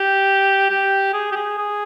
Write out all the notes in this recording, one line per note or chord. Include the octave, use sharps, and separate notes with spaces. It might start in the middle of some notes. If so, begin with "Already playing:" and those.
Already playing: G4
G4
G#4
G4
G#4
G#4